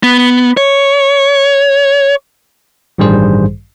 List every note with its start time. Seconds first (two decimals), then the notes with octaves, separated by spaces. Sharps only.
0.03 B3
0.57 C#5
2.98 A1 G2 D#3 G3 G#4 C5